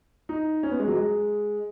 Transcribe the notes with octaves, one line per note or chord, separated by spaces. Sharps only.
D#4
C#4
B3
G#3
F#3
G#3